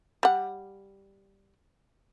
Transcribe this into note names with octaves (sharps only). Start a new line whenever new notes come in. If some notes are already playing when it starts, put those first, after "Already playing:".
G3 F#5